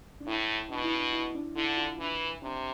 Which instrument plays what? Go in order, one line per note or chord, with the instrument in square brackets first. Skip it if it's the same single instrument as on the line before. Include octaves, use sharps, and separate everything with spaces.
[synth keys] D4
[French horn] A2 [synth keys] E4
[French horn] B2 [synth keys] D4
[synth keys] E4
D4
E4
D4
[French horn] D3 [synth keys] E4
[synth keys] E4
D4 F4
[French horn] E3 [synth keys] D4
[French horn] C3 [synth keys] D4